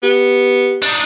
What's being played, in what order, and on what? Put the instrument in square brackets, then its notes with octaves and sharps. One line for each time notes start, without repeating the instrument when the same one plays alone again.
[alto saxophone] B3 [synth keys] G4
[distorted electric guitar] D4 D#4